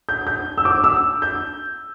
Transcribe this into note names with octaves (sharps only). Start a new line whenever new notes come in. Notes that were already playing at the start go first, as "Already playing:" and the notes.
G6
G6
E6
D6
E6
G6